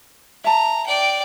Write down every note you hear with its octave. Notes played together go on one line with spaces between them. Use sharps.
E5 A5 A#5
D5 G5